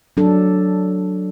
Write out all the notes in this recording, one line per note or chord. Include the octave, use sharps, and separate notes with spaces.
F#3 D4 A4